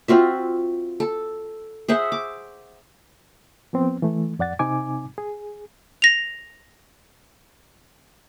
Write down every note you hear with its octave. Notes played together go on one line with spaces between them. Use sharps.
C4 F4 F#4 E5
A4
G#4 C5 E5 F#5
D6
F3 B3 C4
E3 A3
F2 D5 F#5 A6
C3 C4 D#4 G#5 D6
G#4
A#6 F7